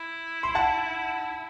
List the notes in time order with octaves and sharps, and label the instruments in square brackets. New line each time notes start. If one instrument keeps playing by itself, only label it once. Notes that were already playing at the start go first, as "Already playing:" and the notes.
Already playing: [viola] E4
[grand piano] C6
F#5 A5